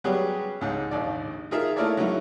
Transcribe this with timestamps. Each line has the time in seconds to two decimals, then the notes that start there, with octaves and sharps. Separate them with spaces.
0.04 F#3 G3 B3 C#4 G4 G#4
0.61 C#2 G#2
0.91 A#1 D#2 D#4 D5
1.51 D#4 F4 G#4 A#4 E5
1.76 A3 A#3 E4 A#4 C#5 D5
1.97 F#3 G#3 A#3 C#4 D#4 E4